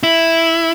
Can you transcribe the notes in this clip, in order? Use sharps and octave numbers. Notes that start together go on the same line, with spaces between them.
E4